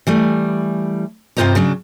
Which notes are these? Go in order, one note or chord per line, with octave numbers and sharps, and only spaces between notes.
E3 G3 A3
G2 C3 F4 C5 D#5 A#5
C#3 F#3 D4